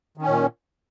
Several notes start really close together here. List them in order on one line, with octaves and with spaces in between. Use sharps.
D#3 C#4 A#2